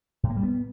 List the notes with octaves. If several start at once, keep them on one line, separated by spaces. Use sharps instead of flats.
A2
A#3
G3
B3